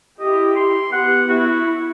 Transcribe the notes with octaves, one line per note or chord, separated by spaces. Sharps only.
E4 G4 D#5
C6
B3 G4 F#5
E4 F#4